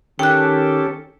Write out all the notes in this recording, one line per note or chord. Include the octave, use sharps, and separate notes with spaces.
D#3 C#4 G4 A4 G5 F#6